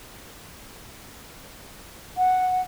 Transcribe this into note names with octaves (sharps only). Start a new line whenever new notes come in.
F#5